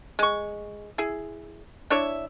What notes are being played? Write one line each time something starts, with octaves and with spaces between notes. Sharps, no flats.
G#3 C#6
E4 G#4
D4 E4 C#5 E5